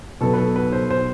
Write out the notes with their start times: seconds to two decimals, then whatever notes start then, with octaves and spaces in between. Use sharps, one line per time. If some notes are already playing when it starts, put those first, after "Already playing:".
0.21 B2 F#3 B3 A4
0.33 B4
0.38 A4
0.56 B4
0.72 C5
0.90 C5